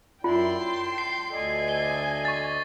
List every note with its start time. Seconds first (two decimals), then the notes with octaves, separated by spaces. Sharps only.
0.24 F#2 E4 F4 D5 G5 C6
0.60 A5
0.98 C7
1.32 D2 A4 D5 D#5 G#5
1.68 C7 G7
2.25 C#6 A6